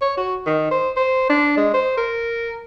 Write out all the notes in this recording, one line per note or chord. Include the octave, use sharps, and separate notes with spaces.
C#5
F#4
D#3
C5
C5
D4
G#3
C5
A#4